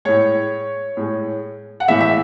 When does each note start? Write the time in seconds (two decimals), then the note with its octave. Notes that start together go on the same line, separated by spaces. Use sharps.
0.05 A2 G#3 C#5
0.97 A2 G#3
1.80 F#5
1.88 A2 E3 G#3 E5
2.01 E5